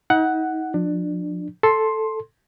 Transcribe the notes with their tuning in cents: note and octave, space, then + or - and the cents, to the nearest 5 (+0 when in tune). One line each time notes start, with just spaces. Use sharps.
D#4 +35 F#5 +5
F3 +30 D4 +20
A4 +0 C6 +10